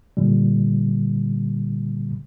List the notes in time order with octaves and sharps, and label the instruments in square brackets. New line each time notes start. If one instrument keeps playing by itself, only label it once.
[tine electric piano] A#2 D3 G3